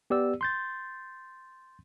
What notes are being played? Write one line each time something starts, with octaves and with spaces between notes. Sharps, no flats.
B3 G4 D5 E6
C6 G6 A6